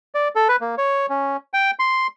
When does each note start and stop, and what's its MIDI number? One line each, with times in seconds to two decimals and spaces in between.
0.14 0.28 74
0.35 0.48 69
0.49 0.56 71
0.61 0.75 58
0.78 1.06 73
1.10 1.37 61
1.54 1.71 79
1.79 2.07 84